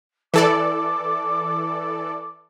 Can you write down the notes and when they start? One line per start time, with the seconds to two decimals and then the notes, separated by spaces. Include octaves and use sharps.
0.34 E3 A4 D5 D6